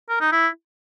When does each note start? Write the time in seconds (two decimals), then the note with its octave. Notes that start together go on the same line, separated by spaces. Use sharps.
0.09 A#4
0.21 D#4
0.32 E4